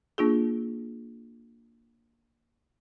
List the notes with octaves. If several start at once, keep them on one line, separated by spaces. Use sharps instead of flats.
A#3 D4 F4 G#4